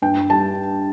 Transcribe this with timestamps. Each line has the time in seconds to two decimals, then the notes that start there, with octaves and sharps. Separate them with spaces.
0.02 G2 G5
0.30 G3 A5